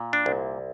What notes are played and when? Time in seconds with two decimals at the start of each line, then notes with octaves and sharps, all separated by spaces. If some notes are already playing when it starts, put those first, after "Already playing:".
Already playing: A#2
0.13 D4
0.26 C2